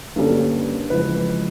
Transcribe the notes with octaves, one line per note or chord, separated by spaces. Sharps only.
G2 D3 G3 A#3 C#4 A4
F2 C#3 E3 G#3 C4 B4